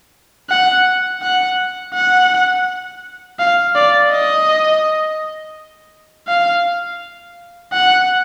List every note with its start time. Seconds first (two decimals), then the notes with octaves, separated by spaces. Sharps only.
0.50 F#5
1.22 F#5
1.94 F#5
3.39 F5
3.75 D5
4.11 D#5
6.28 F5
7.73 F#5